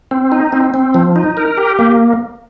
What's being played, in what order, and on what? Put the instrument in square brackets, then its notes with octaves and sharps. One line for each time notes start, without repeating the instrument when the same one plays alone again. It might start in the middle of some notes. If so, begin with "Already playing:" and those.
[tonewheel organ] C4
D#4
C4
C4
F3
D#4
A#4
G4
A#3